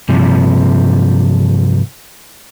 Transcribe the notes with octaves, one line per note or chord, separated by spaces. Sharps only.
G2 C3 F3